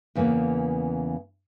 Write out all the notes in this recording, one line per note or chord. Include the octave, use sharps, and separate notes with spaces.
E2 C#3 E3 G#3 A#3